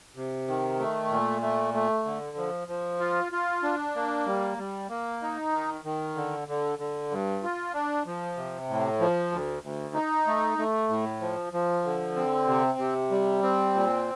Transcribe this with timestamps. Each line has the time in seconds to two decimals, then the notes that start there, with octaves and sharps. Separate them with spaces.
0.15 C3
0.48 D#3
0.79 A3
1.10 A#2
1.42 A3
1.74 A3
2.05 D3
2.37 F3
2.68 F3
3.00 F4
3.32 F4
3.63 D4
3.95 A#3
4.26 G3
4.58 G3
4.89 A#3
5.22 D#4
5.53 D#3
5.85 D#3
6.15 D3
6.48 D3
6.79 D3
7.11 G2
7.43 F4
7.74 D4
8.06 F3
8.37 C3
8.69 A2
9.00 F3
9.31 D2
9.63 D2
9.94 D#4
10.27 A3
10.58 A3
10.89 A2
11.21 F3
11.53 F3
11.85 D3
12.16 C4
12.47 C3
12.79 C3
13.11 G3
13.43 C4
13.75 A#2